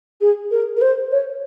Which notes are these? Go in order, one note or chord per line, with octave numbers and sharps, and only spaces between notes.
G#4
A#4
A#4
C5
C#5